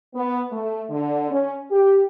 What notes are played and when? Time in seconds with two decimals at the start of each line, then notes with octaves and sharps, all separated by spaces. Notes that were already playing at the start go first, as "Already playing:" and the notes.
0.14 B3
0.51 A3
0.90 D3
1.30 C#4
1.70 G4